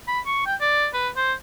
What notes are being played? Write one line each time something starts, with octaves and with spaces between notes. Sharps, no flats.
B5
C#6
G5
D5
B4
C5